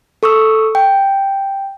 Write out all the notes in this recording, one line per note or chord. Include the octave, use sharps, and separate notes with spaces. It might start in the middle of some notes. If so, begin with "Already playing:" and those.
A4 C#6 D#6 E6
G5